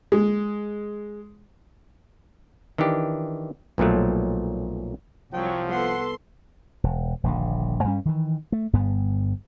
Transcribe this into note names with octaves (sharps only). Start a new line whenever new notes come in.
G#3
D#3 E3 D4 G4
B1 A#2 F3 F#3 A3
C2 F3 F#3 G5
B3 A4 F#5 C6
E1
D#1 A#1 D3
G2 G3 C#4
D#3 E3
A3
G1 G2 B3